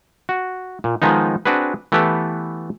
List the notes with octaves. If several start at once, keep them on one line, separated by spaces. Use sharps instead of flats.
F#4
A#2
D#3 F3 G#3 B3 D#4
C4 D4 F#4 G#4 B4
E3 A3 B3 G4 A4 B4